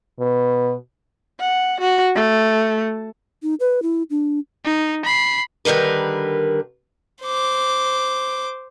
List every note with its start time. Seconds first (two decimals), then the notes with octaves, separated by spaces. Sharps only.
0.20 B2
1.40 F#5
1.81 F#4
2.15 A3
3.43 D#4
3.60 B4
3.82 E4
4.10 D4
4.65 D#4
5.05 B5 C7
5.65 D3 D#3 G3 A#4 B4
7.22 C5 D6